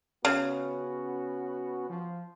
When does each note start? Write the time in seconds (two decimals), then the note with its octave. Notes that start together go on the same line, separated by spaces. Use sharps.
0.25 C#3 B3 C#4 F#4
1.90 F3